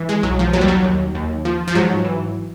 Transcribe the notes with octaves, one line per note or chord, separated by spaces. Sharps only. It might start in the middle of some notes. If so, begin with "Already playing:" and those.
Already playing: E3
G#3
B1 F#3
F3
D#2 F#3
G3
F#3
D#2
D#2
F3
F3
G#2 F#3
E3